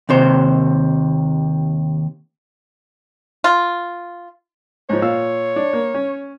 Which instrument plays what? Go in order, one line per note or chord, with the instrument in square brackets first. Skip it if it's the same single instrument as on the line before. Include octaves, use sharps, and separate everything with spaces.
[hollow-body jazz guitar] D#2 C3 C5
[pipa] F4
[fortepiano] G#2 F3 [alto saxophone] C#5
[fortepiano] A#2 F5 E6
D4
A#3
C#4